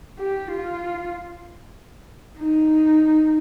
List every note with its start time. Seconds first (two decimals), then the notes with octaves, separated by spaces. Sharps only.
0.18 G4
0.51 F4
2.38 D#4